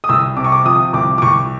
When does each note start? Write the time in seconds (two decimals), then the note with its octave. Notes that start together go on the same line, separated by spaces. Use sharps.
0.04 D#6
0.09 C2 E6
0.37 C3 D6
0.44 C#6
0.52 D6
0.65 F3 D#6
0.93 C2 D6
1.18 D6
1.22 C2 C#6